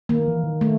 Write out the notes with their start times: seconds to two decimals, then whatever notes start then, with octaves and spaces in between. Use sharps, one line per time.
0.09 D#3 A#3
0.28 E3
0.44 D#3
0.61 A3